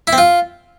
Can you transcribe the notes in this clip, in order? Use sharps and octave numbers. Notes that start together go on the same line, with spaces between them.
E4
C4
F4